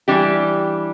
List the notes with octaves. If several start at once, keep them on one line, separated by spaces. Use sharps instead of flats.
E3 G3 D4 G4